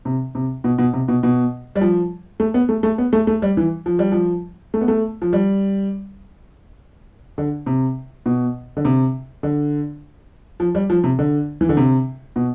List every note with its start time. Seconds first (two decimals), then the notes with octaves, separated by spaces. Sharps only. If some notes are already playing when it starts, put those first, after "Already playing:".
0.05 C3
0.35 C3
0.64 B2
0.78 B2
0.93 C3
1.08 B2
1.23 B2
1.76 G3
1.81 F3
2.40 A3
2.54 B3
2.69 A3
2.83 A3
2.98 B3
3.13 A3
3.27 A3
3.42 G3
3.57 E3
3.86 F3
3.99 G3
4.12 F3
4.74 A3
4.81 B3
4.88 A3
5.22 F3
5.33 G3
7.38 D3
7.66 C3
8.26 B2
8.77 D3
8.85 C3
9.43 D3
10.60 F3
10.75 G3
10.90 F3
11.04 C3
11.19 D3
11.61 E3
11.69 D3
11.77 C3
12.36 B2